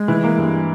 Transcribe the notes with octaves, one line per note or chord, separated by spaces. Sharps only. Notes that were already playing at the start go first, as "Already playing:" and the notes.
Already playing: G#3
E3
A#3
G2